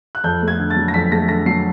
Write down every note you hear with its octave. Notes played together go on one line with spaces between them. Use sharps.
F#6
F2 G6
A3
G#6
D3
A6
F#3
A#6
F2 B6
A3 A#6
D3 A#6
F#3 C7